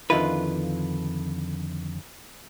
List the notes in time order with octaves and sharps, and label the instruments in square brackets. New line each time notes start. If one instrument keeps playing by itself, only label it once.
[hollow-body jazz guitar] F2 D3 D#3 E4 F4 B4